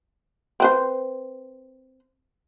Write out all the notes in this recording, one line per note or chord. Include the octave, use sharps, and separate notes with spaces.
C4 B4 C5